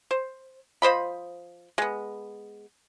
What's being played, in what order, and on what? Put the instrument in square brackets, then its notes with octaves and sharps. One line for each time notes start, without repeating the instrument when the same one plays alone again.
[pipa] C5
F3 C5 D#5 B5
G#3 B3